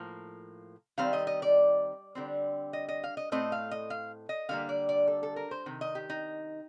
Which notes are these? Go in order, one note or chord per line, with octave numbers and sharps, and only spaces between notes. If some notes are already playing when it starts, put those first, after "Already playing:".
Already playing: A2 F3 A#3
D#3 G3 C4 F5
D#5
D#5
D5
D3 G3 C4
D#5
D#5
F5
D#5
A2 A3 C4 D#5
F5
D#5
F5
D#5
D3 G3 A#3 F5
D5
D5
A4
A4
A#4
C5
C3 D#3
D#5
G4
D#4